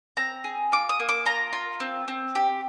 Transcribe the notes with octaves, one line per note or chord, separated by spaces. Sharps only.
C4 A#5
G#4
F4 D6
D#6
A#3
D6
F4 A#5
F4
C4
C4
G4